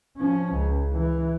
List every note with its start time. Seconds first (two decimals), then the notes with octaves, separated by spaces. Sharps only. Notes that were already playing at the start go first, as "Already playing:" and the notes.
0.18 F3 C#4
0.53 C#2
0.93 E3